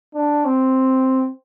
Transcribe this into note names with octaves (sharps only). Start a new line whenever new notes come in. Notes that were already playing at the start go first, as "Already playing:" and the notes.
D4
C4